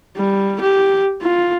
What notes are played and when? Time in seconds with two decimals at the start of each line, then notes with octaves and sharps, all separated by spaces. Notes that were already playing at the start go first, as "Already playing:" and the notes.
0.17 G3
0.61 G4
1.22 F4